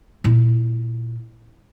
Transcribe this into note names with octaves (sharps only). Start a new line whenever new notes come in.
A#2 E4